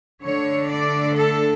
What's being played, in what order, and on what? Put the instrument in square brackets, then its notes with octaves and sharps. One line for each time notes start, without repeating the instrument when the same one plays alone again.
[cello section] D3 A3 D4 C#5
D5
A4